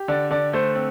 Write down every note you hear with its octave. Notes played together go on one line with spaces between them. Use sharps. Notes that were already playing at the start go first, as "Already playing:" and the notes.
Already playing: G4
D3 D5
D3 D5
A3 C5
C4